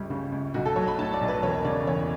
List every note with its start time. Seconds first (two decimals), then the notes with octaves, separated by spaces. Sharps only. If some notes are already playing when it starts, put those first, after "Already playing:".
Already playing: G1 C#2 G3
0.10 C#3
0.32 C#2
0.54 B1 F#4
0.66 A4
0.76 F#3 C#5
0.88 B5
0.99 A2 A5
1.14 D5
1.21 B1
1.28 B4
1.43 E1 C#5
1.65 C#3 D5
1.87 E2 C#5